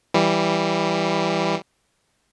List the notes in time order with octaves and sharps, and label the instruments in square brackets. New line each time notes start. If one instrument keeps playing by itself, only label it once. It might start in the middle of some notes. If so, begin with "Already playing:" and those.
[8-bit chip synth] E3 G3